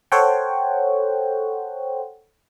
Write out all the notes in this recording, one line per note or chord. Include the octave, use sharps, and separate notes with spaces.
A4 C5 C#5 F#5 G5